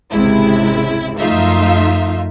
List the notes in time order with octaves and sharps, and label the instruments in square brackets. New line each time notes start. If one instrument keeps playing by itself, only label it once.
[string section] G#1 C#2 C3 G#3 E4
F#2 F3 A3 D#4 F4 E5